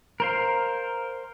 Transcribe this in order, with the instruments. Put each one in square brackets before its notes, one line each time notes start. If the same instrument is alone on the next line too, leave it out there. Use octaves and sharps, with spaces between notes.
[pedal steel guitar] A#4 C5 F5